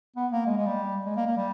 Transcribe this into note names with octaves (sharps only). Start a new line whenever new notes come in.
B3
A#3
G#3
G#3
G3
G#3
A#3
A#3
G3